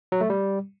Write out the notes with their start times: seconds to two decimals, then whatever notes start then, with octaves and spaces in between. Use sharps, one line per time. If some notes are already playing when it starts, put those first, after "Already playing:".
0.12 F#3
0.21 A3
0.30 G3